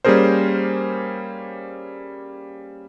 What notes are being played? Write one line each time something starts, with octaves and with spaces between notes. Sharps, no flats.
G3 A#3 C#4 G#4 A#4 C5